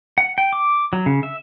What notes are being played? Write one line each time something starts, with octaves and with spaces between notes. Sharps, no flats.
F#5
G5
D6
F#3
C#3
E5